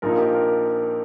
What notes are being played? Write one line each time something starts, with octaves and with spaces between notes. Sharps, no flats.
A#1 A#2 F3 A#3 D#4 A#4
G4
A#4